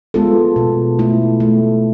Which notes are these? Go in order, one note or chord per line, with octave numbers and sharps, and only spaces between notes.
G#3 B3 F4 A4
B2
A3 E4
A3